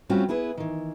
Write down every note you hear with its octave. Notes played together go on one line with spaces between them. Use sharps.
G3 A3 C4 C#4 F4 F#4
B3 E4 G#4 B4
D#3 E3